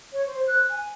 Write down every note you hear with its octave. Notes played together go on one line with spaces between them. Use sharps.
C#5
C5
F#6
G#5